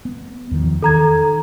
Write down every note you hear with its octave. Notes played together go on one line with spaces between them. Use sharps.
B3
E2 D#3 F3
D#3 A4 A#5 G#6